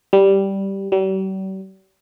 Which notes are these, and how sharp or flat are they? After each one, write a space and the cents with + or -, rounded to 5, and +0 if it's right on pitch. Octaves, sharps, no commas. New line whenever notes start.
G3 -5
G3 -45